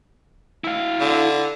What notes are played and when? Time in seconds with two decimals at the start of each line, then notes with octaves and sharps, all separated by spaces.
0.64 E4 F5
1.00 D3